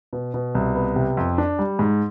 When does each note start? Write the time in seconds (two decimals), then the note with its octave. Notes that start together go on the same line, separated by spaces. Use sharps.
0.13 B2
0.34 B2
0.55 C2
0.75 B3
0.96 C3
1.17 F2
1.38 D4
1.59 G3
1.79 G#2